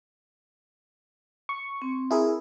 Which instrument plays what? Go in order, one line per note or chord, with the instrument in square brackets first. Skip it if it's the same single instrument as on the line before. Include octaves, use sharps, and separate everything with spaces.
[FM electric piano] C#6
[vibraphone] C4
[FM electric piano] E4 G#4 A#4